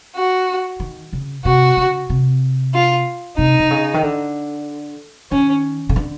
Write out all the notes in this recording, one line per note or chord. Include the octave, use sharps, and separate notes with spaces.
F#4
D#3
C#3
C3 F#4
C#3
C3
F4
C3 D#4
C3
C#3
D#3
D3
D#3 C#4
C#3
D3